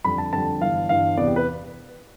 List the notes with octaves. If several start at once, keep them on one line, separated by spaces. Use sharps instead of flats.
F2 D3 G3 B5
A5
F2 D3 G3 A5
G1 G2 E3 F5
G1 G2 E3 F5
E2 C3 E3 B3 D5
G4
B4